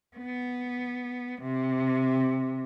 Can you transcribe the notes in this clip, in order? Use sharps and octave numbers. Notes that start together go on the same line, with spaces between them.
B3
C3